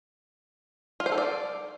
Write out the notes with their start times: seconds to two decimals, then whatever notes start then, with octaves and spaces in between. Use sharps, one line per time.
1.00 F4
1.06 C5
1.12 A4
1.18 D5